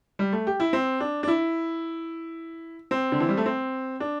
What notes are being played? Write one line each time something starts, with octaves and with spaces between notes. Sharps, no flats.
G3
A3
G4
E4
C4
D4
D4
E4
C4
D3
E3
G3
A3
C4
D4